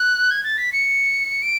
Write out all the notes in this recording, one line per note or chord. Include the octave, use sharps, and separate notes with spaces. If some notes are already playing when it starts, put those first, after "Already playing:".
Already playing: F#6
G#6
A6
B6
C#7
D7